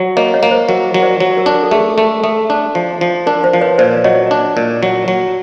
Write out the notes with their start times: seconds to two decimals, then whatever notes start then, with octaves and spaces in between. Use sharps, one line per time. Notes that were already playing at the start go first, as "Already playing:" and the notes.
Already playing: F#3
0.17 A#3 C#5 D#5
0.34 C#5 D#5
0.43 A#3
0.51 C5
0.69 F#3 A#4
0.94 F#3
1.02 C5 D5
1.20 F#3
1.37 A#4
1.46 D4
1.55 A#4
1.63 A4
1.71 A3 G#4
1.81 A4
1.98 A3
2.24 A3 A4
2.50 D4
2.75 F3
3.01 F3
3.26 D4 A#4
3.44 C5
3.53 F3
3.61 B4 C#5
3.78 A#2 C5 D5
4.04 F#3 C#5 D#5
4.31 D4
4.57 A#2
4.83 F#3
5.08 F#3